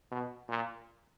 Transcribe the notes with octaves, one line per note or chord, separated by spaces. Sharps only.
B2
A#2